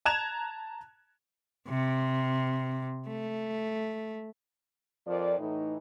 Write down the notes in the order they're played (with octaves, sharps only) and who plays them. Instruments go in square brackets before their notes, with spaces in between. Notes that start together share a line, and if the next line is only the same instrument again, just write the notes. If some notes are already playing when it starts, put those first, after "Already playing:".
[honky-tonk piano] A5 A#5 F#6 G#6 E7 F7
[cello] C3
A3
[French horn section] F2 F3 A#4 D5
A2 E3 D#4